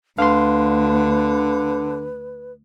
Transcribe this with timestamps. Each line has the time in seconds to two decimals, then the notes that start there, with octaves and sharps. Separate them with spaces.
0.19 D2 D3 B4 F5 C6